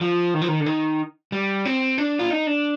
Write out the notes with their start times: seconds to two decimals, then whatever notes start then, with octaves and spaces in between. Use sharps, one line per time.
0.01 F3
0.34 D#3
0.42 F3
0.48 D#3
0.60 D3
0.66 D#3
1.32 G3
1.65 C4
1.98 D4
2.19 F4
2.30 D#4
2.47 D4